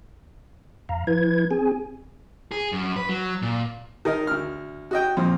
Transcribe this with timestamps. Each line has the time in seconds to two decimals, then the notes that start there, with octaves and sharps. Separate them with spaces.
0.89 F2 F5 A#5
1.07 F3 E4 B4 G#6
1.51 C4 G#4 G#5
2.52 G#4
2.72 F#2
2.96 B4
3.09 F#3
3.42 A#2
4.05 D#3 A#4 D#5
4.27 D2 F6
4.91 F#4 D#5 G5
5.17 F2 A#2